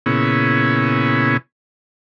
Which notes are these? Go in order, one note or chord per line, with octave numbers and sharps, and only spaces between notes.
A#2 C#3 B3 C#4 E4 G#4